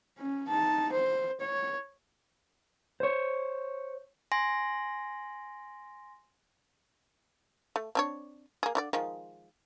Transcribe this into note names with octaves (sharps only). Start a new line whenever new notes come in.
C#4
D#4 A5
C5
C#5
C5 C#5
G#5 C6 A#6
A3
C4 D4 C#5
A#3 G#4
D3 F#4 D5
D#3 F3 G#3